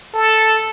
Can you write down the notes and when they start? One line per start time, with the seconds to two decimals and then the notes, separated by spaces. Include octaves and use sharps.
0.14 A4